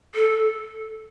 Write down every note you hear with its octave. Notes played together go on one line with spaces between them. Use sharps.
A4